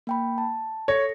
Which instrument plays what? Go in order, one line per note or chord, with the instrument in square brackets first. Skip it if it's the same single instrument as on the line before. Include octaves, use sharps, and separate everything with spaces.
[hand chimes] A#3 G5 B5
A5
[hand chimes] A4 A#6 C#7 [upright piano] C#5